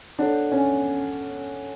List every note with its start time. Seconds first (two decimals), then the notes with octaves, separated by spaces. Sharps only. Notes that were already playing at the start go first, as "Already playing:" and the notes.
0.19 D4 A4 C#5 F#5
0.52 C#4